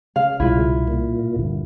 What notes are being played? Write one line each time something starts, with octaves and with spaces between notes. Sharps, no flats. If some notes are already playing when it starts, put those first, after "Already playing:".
C#3 F5
C2 B2 G3 E4 F4
A#2
D2 G2